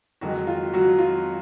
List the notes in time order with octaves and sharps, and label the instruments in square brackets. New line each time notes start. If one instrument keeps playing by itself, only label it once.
[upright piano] F2 D#3 F#3 G#3 F#4
F4
F#3 F#4
F4